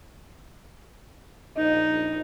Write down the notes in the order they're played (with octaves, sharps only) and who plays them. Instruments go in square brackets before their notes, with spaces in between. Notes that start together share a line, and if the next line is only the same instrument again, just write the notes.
[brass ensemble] A#1 D#5 [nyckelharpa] D#4